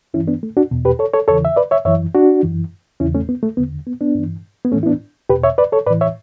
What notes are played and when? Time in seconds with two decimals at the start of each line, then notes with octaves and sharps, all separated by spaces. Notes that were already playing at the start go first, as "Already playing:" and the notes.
0.14 G2 E3 C#4 E4
0.28 B3 D4
0.43 A3
0.57 D4 F#4
0.71 E2 B2
0.85 G4 B4
0.99 A4 C#5
1.13 A4 C#5
1.28 E2 C#3 E3 A4 C#5
1.45 E5
1.56 B4 D5
1.71 C#5 E5
1.85 F#2 E3 C#5 E5
2.14 D4 F#4
2.43 F#2 E3
3.00 E2 C#3 E3 C#4 E4
3.14 A3 C#4
3.29 B3
3.43 A3
3.57 E2 D3 B3
3.87 B3
4.01 B3 D4
4.15 G2 E3
4.65 B3
4.72 A2 E3 A3 C#4
4.83 E4
4.86 B3 D4
5.29 E2 B2 G4 B4
5.44 C#5 E5
5.58 B4 D5
5.72 A4 C#5
5.86 A2 B4 D5
5.91 E3
6.01 C#5 E5